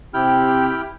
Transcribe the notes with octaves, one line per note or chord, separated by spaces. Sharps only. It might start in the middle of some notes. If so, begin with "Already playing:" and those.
C3 C4 E4 G4 G5 F6